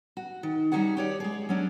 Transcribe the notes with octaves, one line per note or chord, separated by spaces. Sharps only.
F#4
D#3
G3 C#4 D#4 F#4 G#4 F#5
G4 C#5 D5
G#3 G#4
F#3 C#4 D4